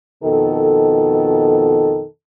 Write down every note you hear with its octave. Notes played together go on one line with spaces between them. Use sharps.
F2 B2 D#3 A4